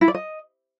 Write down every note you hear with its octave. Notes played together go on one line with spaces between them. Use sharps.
E4
D5
D#5